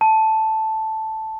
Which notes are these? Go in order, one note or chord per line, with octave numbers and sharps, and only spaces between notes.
A5